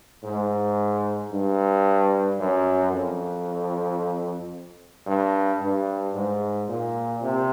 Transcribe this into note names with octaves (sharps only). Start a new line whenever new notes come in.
G#2
G2
F#2
F2
G2
G2
G#2
A#2
C3